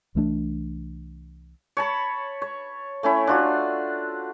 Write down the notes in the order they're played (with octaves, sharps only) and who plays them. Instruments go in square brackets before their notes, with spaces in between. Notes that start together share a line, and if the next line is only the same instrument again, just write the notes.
[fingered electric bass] C2 E3 A3 D4
[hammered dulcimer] C#5 A5 B5
C#5
A3 C#4 E4
D4 F4 F#4